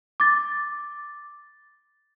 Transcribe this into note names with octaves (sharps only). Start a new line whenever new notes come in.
D6 A6